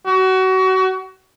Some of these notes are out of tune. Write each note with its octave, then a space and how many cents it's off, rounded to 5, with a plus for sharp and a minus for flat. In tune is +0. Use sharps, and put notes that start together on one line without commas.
F#4 +25